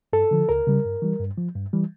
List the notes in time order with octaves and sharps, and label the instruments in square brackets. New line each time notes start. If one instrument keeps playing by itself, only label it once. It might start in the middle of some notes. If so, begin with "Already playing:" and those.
[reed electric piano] G2 A4
D3 F3
C#2 A#4
C#3 G3
G2
E3 G3
G2
F3
G2
E3 G3